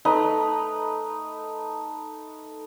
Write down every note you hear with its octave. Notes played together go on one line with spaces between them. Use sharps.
A3 D#4 B4